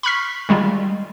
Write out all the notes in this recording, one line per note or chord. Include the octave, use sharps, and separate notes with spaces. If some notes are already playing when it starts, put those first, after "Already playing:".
B5 C#6 F6 B6
D#3 G3 G#3 F4